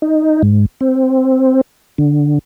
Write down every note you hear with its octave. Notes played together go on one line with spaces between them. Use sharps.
D#4
G#2
C4
D3